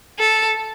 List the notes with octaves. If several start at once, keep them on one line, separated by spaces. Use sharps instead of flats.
A4